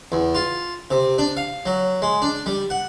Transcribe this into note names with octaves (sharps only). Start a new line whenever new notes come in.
E2
F4
C3
D4
F5
F#3
G#3
D4
G3
F#5